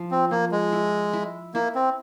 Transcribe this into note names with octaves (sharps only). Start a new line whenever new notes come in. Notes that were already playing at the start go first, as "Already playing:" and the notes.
Already playing: F3 F4
C4
F3 A#3
G#3
E4
E4
A#3 E4
C4